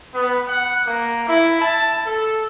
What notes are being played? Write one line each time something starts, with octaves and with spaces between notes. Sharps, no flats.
B3
F#5
A#3
E4
A5
A4